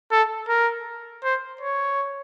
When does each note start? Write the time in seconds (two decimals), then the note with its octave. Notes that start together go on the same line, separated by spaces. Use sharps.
0.11 A4
0.48 A#4
1.23 C5
1.61 C#5